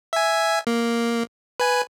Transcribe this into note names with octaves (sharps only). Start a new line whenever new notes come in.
E5 G#5
A#3
B4 G#5